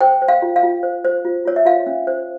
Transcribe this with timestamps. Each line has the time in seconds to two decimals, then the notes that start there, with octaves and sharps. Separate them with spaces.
0.01 C5 G5
0.22 C5
0.28 F5
0.42 F4
0.56 F5
0.63 F4
0.83 C5
1.05 C5
1.25 F4
1.45 F4 C#5
1.56 E5
1.65 F4 F5
1.87 C#4
2.07 C5